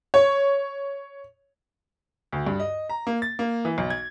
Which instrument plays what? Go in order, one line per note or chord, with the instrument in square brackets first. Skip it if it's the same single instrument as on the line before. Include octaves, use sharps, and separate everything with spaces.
[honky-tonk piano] C#5
[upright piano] D2
G2
D#5
A#5
A#3
A6
A#3
E3
B1
G#6